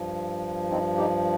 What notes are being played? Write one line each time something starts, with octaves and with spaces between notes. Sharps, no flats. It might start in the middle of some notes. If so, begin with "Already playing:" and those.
Already playing: G2 F3
C4 D#4
D#4 G4